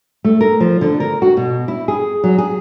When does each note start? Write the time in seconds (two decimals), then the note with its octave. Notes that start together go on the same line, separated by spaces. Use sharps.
0.25 A3
0.41 A#4
0.60 F3
0.81 D3
1.00 A#4
1.22 F#4
1.37 B2
1.68 E4
1.88 G#4
2.24 F#3
2.38 G#4